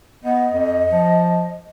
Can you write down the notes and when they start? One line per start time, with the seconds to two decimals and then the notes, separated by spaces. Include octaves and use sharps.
0.24 B3 D#5
0.51 F2
0.92 F3